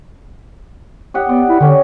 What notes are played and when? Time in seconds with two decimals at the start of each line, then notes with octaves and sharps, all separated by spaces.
1.14 G4 D#5 F#5
1.29 B3 D5
1.49 E4
1.60 D3 C#4 G4